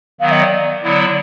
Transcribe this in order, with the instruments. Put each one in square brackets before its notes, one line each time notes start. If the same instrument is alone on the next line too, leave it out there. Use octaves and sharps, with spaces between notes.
[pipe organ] D#3 F#3 B3 [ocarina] F5
[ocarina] D#5
D5
[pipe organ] D3 F#3 B3 E4